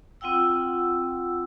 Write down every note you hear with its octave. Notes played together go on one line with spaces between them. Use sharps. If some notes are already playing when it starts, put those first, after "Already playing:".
C4 F4 F#5 G5 E6